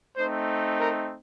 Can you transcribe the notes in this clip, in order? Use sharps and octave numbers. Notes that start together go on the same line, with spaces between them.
A3 C4 D#4 C5
A#4